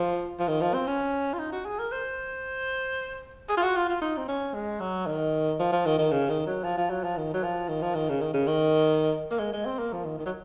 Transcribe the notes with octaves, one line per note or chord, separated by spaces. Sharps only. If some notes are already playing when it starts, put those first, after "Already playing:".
Already playing: F3
F3
D#3
F3
C4
C#4
F4
D#4
F#4
G#4
A#4
C5
G#4
F4
F#4
F4
F4
D#4
C4
C#4
G#3
F#3
D#3
F3
F3
D#3
D#3
C#3
D#3
F#3
F3
F3
F#3
F3
D#3
F#3
F3
D#3
F3
D#3
C#3
D#3
C#3
D#3
A#3
G#3
G#3
C4
A#3
F3
D#3
D#3
F#3